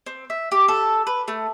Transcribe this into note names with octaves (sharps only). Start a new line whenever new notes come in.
C4
E5
G4
A4
B4
A3